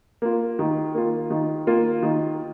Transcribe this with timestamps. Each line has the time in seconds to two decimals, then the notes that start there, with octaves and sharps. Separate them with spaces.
0.22 A#3 F4
0.59 D#3
0.94 A#3 F4
1.30 D#3
1.67 A#3 F4
2.03 D#3